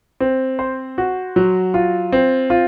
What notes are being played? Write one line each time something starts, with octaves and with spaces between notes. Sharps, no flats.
C4
C5
F#4
F#3
F4
C4
F4